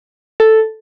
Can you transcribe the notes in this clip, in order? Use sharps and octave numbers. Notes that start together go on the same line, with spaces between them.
A4